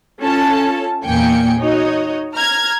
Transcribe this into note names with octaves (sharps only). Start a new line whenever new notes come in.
C#4 F4 A4 A5
E2 A#2 A#3 G5 G#5 C#7
D#4 F#4 C#5 D#5
A#5 F6 G#6